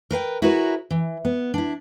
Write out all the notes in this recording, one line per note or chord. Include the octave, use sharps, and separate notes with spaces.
A#4 B4 F5 G5
E4 F#4 G#4 A#4 B4 C#5
E3
B3
D4 E4